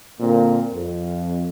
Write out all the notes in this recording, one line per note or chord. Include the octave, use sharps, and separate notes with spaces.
A#2 D3 A#3 C4
F2